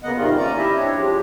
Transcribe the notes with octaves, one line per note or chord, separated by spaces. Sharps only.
C#3 A#3 B3 D#5 F#5
G#2 C3 D#3 G3 F4
D#2 C#4 D5 A#5
E4 G4 D#5 E5
C4 D4 G4 C#5
F3 G#3 G4